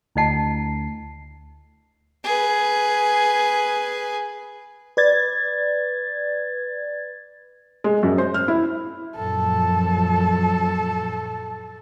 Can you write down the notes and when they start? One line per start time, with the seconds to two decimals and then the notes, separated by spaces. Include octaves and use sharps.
0.16 D2 E4 D#5 A5 C7
2.24 G#4 B4
4.97 B4 D5 G#6 A6
7.84 G#3
8.03 F#2
8.18 C5
8.34 F6
8.48 E4
9.16 F#2 A#2 F3 A4